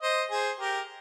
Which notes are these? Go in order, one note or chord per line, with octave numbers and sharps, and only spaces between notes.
C5 D#5
G#4 C5
G4 A#4